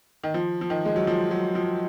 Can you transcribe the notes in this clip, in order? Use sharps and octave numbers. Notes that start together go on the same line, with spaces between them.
D#3
F3
F3
D#3
G#3
F#3
F3
F#3
F3